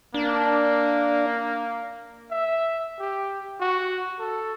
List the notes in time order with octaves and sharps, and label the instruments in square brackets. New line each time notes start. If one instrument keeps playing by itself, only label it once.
[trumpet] A#3 [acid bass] D4
[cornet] E5
G4
F#4
A4